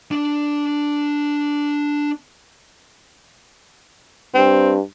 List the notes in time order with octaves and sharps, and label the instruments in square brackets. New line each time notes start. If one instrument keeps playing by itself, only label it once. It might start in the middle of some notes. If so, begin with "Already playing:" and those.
[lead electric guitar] D4 D5
[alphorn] G2 [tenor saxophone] C4